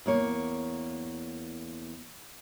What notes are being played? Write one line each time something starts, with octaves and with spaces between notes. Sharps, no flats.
E2 A#3 C#5